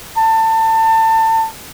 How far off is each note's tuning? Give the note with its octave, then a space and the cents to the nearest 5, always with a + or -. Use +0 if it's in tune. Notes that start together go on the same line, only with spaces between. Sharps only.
A5 +25